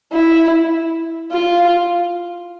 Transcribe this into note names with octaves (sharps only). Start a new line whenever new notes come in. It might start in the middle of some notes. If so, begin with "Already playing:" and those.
E4
F4